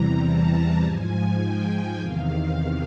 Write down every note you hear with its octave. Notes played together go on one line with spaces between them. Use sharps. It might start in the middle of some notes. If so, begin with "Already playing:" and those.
Already playing: E2 C3 E3 G3 A#5
A5
G#2 F3 G#5
G5
E2 C3 D#3 F5